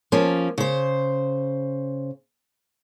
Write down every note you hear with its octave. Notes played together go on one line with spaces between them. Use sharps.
F3 A#3 C#4
C#3 C5